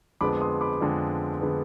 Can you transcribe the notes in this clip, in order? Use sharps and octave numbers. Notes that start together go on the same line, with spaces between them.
F2 D3 G#3 B3 B5 D6
C6 D#6
B5 D6
F2 D3 G#3 B3
D3 G#3 B3